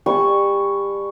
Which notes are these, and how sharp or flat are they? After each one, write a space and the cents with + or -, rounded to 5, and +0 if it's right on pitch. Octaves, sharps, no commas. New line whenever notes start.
G3 +25 G#5 +40 C#6 +0